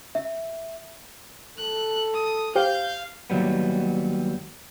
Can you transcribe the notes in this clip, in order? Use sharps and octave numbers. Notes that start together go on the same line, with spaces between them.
E5
A4 F#6
D#6
G4 C5 F5 G5 G6
D#2 F#3 G3 B3